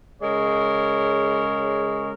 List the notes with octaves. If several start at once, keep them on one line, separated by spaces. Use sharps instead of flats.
C#3 G#3 A#4 C#5